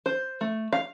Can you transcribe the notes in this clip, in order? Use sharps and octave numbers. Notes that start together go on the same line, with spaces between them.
C5
A3
F5